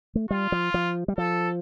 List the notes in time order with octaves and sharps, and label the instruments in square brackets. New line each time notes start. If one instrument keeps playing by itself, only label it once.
[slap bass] A3
[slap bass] G3 [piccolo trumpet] F4
[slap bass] F3
F3
G3
[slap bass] F3 [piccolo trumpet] A4